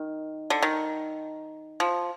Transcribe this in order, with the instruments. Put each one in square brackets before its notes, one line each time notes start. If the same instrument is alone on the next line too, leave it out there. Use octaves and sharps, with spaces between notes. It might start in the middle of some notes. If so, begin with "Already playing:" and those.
Already playing: [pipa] D#3
D3
D#3
F3